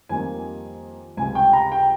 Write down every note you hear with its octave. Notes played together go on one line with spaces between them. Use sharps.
F2 D#3 G3 A#3 G#5
C#2 C3 G3 G#5
G5
A#5
G5